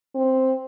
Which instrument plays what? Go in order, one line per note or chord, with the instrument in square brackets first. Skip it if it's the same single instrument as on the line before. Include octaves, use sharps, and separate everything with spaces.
[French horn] C4